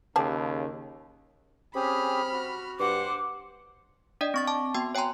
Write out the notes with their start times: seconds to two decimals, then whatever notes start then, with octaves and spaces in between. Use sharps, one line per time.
0.16 D#2 C#3 G4 G#4 A5
1.75 C4 C#4 G4 G#4 B5 F6
2.32 F#4
2.79 G2 C5 F#5 D6
4.21 D4 D5 D#5 G5
4.34 C4 C#6 A6
4.47 A5 D6
4.74 B3 F#4 G5 C6
4.95 C#5 G5 G#5 A#5 C6